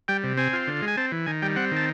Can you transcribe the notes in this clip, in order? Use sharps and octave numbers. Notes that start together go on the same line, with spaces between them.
G3 G5
C3
C4 G#5
F4
D3
G#3
G#5
C4 A5
E3
D#3 G#5
G3 G5
C4 F#5
D#3 A5